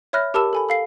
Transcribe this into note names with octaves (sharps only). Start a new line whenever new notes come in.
C#5 E5 B5 F6 F#6 A#6
G4 A#4 A5 B5 E6 E7
A4 G#5 B5
A4 F5 C7